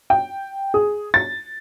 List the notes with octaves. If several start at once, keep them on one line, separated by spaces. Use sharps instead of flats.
G5
G#4
A6